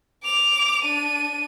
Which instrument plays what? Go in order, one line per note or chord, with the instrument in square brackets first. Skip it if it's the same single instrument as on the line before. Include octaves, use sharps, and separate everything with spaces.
[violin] D6 F7
D4 D#7